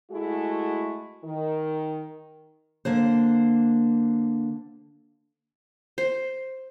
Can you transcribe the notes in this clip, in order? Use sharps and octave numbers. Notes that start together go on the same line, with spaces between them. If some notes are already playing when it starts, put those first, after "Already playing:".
G#3 A3 E4 F#4 G#4
D#3
D3 A#3 C5
C5